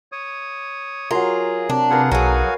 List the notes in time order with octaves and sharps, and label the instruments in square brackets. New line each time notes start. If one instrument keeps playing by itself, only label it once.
[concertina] C#5 D#6
[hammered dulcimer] F#3 A#4 [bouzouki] F4 [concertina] G#4
[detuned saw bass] C3 [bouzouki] D4
[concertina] F4 G#4 F#5 [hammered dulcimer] A#4 B4
[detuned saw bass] B1 [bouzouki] F#3 G#4 [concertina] F#4 F5 G#5